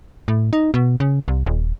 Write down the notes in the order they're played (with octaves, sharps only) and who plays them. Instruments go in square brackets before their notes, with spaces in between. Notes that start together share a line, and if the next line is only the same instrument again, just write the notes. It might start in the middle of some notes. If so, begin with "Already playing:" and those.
[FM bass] A2
D#4
B2
C#3
C2
D#1